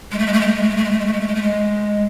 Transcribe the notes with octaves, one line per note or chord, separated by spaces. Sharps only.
G#3
A3
G#3
A3
G#3
A3
G#3
A3
G#3
A3
G#3
A3
G#3
A3
G#3
A3
G#3
A3
G#3